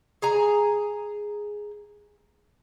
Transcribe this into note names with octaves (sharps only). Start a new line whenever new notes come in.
G#4 G#5 A#5